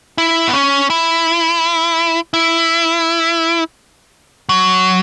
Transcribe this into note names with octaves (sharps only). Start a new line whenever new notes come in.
E4
B3
C#4
E4
E4
F#3